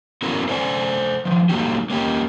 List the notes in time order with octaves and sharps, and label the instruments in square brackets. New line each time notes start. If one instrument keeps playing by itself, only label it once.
[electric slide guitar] B3 C#4 E4 F#4 A4 A#4
A4 C5 D5 G5 G#5
D#3 F3
G3 A3 A#3 D#4 F#4 G4
A#3 C#4 G4